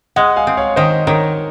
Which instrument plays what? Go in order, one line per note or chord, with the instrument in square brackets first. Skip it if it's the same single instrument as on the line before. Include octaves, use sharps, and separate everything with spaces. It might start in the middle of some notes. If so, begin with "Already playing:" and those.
[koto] G#3 [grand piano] D#5 F#5
[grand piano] F5 G#5
[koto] C4
[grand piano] C#5 F5
[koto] D#3 [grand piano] C5 D#5
[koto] D#3 [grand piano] A#4 C#5